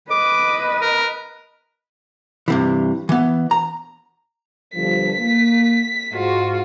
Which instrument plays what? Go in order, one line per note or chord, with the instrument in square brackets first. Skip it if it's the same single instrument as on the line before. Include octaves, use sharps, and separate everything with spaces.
[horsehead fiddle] B4 D#5 [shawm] D6
[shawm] A#4
[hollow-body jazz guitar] G2 C3 E3
E3 B3
A#5
[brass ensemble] G1 G2 F3 [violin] B6
[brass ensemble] A#3
[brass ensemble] G#2 [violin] F4 F#4